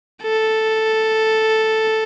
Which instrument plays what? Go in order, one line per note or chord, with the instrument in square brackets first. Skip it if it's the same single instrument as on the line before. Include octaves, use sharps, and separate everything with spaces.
[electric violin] A4